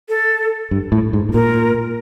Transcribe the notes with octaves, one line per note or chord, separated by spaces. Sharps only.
A4
G2
A2
G#2
A2
A#2 A#4